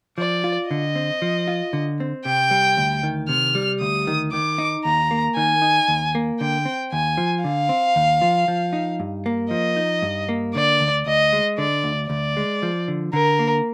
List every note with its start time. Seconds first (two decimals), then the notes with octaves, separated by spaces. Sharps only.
0.18 F3 D5
0.44 F4
0.70 D3 D#5
0.96 C4
1.22 F3
1.48 F4
1.73 D3
2.00 C4
2.25 C3 G5
2.51 G3
2.77 D2
3.03 D#3
3.29 C3 F6
3.55 G3
3.81 D2 D#6
4.07 D#3
4.33 D#3 D6
4.58 D#4
4.85 D#2 A#5
5.11 A#3
5.36 D#3 G#5
5.62 D#4
5.88 D#2
6.15 A#3
6.40 D3 G5
6.65 C4
6.93 D#2 G#5
7.18 F3
7.44 D3 F5
7.69 C4
7.96 D#2
8.22 F3
8.48 F3
8.73 D#4
9.00 G2
9.26 A#3
9.51 F3 D#5
9.76 D#4
10.02 G2
10.29 A#3
10.55 D3 D5
10.81 D2
11.06 D2 D#5
11.33 G#3
11.58 D3 D5
11.84 D2
12.10 D2 D5
12.37 G#3
12.63 F3
12.88 D3
13.13 D3 A#4
13.39 A#3